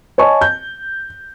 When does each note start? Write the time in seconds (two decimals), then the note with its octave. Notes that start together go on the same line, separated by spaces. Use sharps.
0.18 C#5 D#5 G#5 A5 C#6
0.41 G6